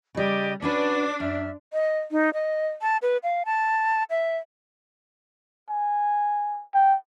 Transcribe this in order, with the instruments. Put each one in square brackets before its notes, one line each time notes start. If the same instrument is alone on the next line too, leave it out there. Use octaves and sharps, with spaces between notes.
[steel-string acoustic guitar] C#3 G3 [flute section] G4 D5 D#5
[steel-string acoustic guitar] C#4 F#4 B4 [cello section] D4 [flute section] D6
[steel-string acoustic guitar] F#2 [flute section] E5 F6
[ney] D#5
D#4
D#5
A5
B4
F5
A5
E5
[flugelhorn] G#5
[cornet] G5